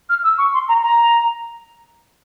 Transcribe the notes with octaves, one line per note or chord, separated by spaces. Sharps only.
F6
E6
C#6
C6
A#5
A#5